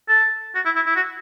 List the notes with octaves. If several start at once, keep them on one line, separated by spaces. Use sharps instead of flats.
A4
F#4
E4
E4
E4
F#4